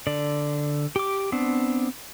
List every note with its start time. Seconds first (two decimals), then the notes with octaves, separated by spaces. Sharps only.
0.07 D3 D5
0.96 G4 D6
1.32 B3 C4 D4